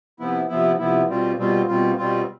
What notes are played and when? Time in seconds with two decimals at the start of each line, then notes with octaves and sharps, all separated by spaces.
0.19 C3 F3 B3 E4
0.48 C3 F3 B3 E4
0.79 C3 F3 B3 E4
1.08 B2 G3 C4 F4
1.38 B2 G3 C4 F4
1.67 B2 G3 C4 F4
1.97 B2 G3 C4 F4